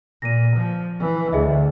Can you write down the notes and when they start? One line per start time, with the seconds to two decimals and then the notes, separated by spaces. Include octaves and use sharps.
0.22 A#2 A#6 D#7
0.56 F3
0.99 E3
1.32 D2 G#4 D#5 E5